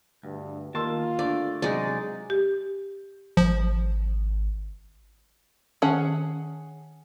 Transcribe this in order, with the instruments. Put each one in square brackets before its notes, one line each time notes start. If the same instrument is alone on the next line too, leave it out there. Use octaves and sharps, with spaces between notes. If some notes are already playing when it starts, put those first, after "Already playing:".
[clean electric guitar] D2 [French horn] G2
[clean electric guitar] D#3 A5 [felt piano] A#3 C6 E6 [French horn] F4
[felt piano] D3 [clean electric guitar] A3 [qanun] D5
[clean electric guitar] C3 F#3 D#4 [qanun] G#3 D5
[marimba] G4
[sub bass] G#1 [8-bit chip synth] F3
[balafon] D#3 A5 [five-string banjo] C#4 G#4 F#5